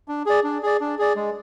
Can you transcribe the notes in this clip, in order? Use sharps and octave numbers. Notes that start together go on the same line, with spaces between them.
D4
G#4 D5
D4
G#4 D5
D4
G#4 D5
G#3